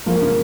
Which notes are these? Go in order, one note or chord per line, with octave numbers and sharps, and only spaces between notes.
F3 A#3
C#3